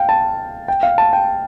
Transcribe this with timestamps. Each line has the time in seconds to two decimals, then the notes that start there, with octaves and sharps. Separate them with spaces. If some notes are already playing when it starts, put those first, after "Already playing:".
Already playing: F5 G5
0.09 A5
0.68 G5
0.83 F5
0.98 A5
1.13 G5